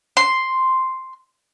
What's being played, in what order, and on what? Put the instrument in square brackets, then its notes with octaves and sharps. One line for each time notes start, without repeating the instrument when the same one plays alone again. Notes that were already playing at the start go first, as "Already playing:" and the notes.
[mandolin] C6